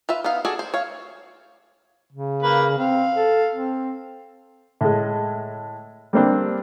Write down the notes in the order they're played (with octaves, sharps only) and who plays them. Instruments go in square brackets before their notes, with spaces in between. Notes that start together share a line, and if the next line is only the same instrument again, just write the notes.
[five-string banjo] F4 B4 E5
B3 D#4 F5
F#4 G#4 A4 D5
C5
C#5 F5
[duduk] C#3
[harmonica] A#3 B4
[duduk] C4 [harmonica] F5
[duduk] A4
C4
[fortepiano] A2 G#3
G3 A#3 C4 D4